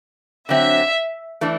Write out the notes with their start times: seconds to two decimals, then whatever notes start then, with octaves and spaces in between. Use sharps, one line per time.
0.49 D3 F#3 C4 E5
1.41 E3 A3 D4